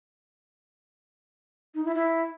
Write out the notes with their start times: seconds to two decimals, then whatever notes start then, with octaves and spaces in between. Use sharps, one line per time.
1.74 D#4
1.85 E4
1.95 E4